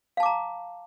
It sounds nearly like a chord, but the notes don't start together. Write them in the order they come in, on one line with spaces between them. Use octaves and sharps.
F5 A5 D6 A#5